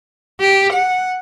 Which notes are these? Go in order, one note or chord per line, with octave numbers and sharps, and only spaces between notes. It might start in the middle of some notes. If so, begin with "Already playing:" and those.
G4
F#5